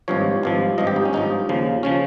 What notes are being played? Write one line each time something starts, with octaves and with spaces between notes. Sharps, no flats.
G#1 G2 F3 C#5
G#1 G2 F3
G#1 G2 F3 D#5
G4
D#4
C#4
G#1 G2 F3 D#4
D#2 C#3 F3
C#3 F3 C#4